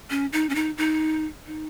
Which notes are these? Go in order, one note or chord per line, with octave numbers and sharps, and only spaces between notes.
C#4
D#4
C#4
D#4
D#4
D#4